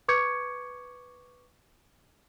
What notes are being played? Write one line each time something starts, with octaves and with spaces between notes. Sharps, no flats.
B4 C#6 D6 G6 G#6 C#7